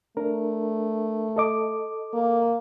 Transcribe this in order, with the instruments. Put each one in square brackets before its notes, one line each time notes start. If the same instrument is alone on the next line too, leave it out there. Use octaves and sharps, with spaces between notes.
[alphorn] A3 [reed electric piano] D4 A#4
[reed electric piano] A4 D#5 D6
[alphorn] A#3